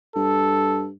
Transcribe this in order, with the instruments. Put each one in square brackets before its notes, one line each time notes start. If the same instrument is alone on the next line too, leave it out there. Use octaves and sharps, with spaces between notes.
[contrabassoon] G2 [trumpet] A4